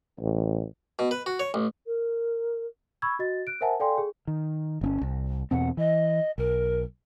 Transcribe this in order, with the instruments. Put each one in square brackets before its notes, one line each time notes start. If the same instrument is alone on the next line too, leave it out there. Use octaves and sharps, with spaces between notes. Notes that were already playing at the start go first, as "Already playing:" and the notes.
[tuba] A1
[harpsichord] B2
B4
F#4
C#5
A1
[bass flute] A#4
[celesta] B5 C#6 E6 G#6
F#4 D#5 A6
F#6 D7
A#4 C5 E5 F#5 G#5 A5
A4 D5 F5 G5 G#5 C6
G#4
[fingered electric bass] D#3
G1 C4 C#4
C2
[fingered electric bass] E2 B2 C4 [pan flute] F#5
[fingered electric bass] E3 [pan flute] D#5
[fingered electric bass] B1 [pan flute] A#4